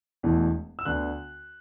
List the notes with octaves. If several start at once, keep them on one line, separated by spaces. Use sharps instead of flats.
E1 E2 E3 A3
E6
D2 D3 B3 F#6